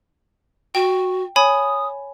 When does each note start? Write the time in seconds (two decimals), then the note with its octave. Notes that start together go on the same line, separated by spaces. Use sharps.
0.75 F#4 G5
1.36 C#5 G#5 B5 D#6